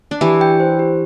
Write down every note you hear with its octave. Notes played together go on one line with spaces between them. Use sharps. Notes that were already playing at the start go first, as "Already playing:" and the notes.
D4
E3 E4 G4
G5
C5
G4